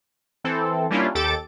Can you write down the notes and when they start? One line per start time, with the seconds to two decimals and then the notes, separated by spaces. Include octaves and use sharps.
0.44 E3 C4 A4
0.90 G3 A#3 C#4 D4 E4 F4
1.15 D#2 G4 A4 D6 A6 D7